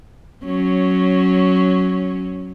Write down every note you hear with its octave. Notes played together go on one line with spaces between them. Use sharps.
F#3 C#4